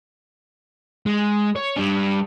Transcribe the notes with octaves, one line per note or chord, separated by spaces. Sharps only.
G#3
C#5
G3 D4